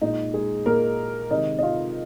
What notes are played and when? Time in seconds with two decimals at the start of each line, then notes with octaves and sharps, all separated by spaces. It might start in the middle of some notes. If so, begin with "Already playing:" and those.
0.01 A#2 G#3 D#4
0.34 G#3 G#4
0.66 A#2 G#3 A#3 A#4
1.31 C3 D#3 G#3 D#4 D#5
1.59 D#5
1.62 F4 F5